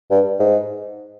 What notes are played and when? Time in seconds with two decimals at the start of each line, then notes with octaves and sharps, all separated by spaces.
0.11 G2
0.40 G#2